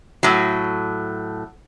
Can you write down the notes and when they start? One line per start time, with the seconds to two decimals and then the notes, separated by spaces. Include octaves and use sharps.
0.23 A2 F#3